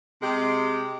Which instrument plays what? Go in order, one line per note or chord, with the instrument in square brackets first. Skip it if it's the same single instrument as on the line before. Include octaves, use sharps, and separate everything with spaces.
[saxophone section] C3 G#3 G4